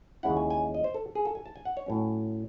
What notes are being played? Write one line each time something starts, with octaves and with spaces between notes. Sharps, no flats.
D#2 C#3 G#3 C#4 E4 F#5
G#5
G#5
D#5
C5
A4
G#4
A4
G#5
A5
G#5
F#5
C#5
A2 F#3 C#4